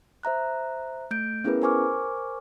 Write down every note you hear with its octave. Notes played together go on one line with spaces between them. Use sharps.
C5 E5 A#5 F#6
A3 G6 D7
B3 C#4 E4 G#4 A#4 B4
A#4 C5 G#5 C#6 D6 F6